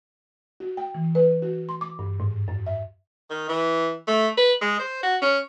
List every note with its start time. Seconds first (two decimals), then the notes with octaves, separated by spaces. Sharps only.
0.60 F#4
0.77 G5
0.95 E3
1.15 B4
1.42 F#4
1.69 C6
1.81 D6
1.99 G2
2.20 G#2
2.48 F#2
2.67 E5
3.30 D#3
3.49 E3
4.08 A3
4.38 B4
4.62 G#3
4.79 C5
5.03 F#4
5.22 C#4